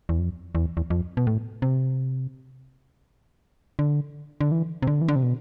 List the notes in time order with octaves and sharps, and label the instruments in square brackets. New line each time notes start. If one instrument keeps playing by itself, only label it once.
[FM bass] E2
F2
E2
E2
F2
B2
A2
C3
D3
D3
E3
C3
D3
E3
D3
C3
B2